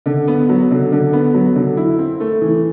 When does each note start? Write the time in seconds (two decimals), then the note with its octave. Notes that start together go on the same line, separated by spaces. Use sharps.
0.06 D3
0.28 B3
0.49 F#3
0.71 D3
0.92 D3
1.13 B3
1.34 F#3
1.55 D3
1.77 E4
1.99 C4
2.20 A3
2.41 E3